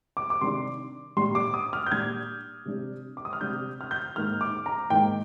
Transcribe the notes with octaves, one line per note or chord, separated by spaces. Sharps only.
D6
D6
C3 D#3 G3 D4 C6
A#2 G3 D4 C6
D6
D#6
F6
G6
A#2 G3 D4 G#6
C3 G3 D4
D6
D#6
F6
C3 G3 D4 G6
F6
G6
G#2 D#3 A#3 D#4 F6
D6
A#5
G#2 D#3 A#3 D#4 G5